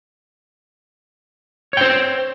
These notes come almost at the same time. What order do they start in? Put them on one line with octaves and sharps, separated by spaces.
C#5 G5 C5